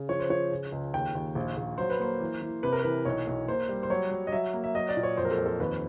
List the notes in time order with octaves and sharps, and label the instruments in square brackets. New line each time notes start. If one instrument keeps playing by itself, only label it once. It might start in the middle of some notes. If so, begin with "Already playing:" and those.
Already playing: [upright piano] C#3
F3 C#5
C5
F3 C#5
C#3
C#2
D#2 G5
D#2
A#1
A#1
F#3 C5
B4
A#3 C5
E3
E3
C3 B4
A#4
E3 B4
B1 C#5
B1
A#3 C5
G3
C5
F#3 C#5
F#3
D#5
F#3 E5
A#3
E5
F#3 D#5
D5
A#2
C#5
F2 C5
A#4
A4
F2
A4
D#2 B4